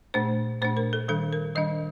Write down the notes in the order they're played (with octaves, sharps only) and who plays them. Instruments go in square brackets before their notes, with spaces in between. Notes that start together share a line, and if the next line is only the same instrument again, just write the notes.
[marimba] A#2 A3 D4 C5
A#2 A3 D4 C5
A#4
A4
D#3 G3 D4 A4
A#4
D#3 G3 D4 D#5